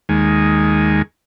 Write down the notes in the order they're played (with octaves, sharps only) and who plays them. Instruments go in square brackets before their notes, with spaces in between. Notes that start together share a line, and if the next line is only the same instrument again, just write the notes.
[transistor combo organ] D#2 G#3